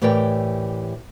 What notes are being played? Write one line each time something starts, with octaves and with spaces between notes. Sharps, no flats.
A2 E3 G4 A#4 D5 G5